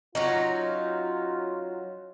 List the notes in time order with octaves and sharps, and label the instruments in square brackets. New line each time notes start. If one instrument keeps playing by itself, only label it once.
[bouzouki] F#3 C#4 D#4 [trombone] F4